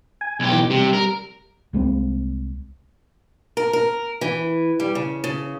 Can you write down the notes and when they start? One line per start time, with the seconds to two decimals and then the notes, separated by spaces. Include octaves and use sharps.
0.21 G#5
0.40 B1 G4
0.52 E3
0.70 C3 G3
0.93 A#4
1.73 C2 G#3 A#3 C4
3.57 A#4
3.73 A#4
4.21 E3
4.80 G3
4.95 C#3
5.24 C#3